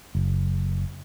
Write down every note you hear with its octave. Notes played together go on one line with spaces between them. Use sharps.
F#1